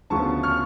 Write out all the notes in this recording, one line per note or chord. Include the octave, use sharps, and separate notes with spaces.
D2 C#3 F3 B3 F4 A5 C#6
C#6 F6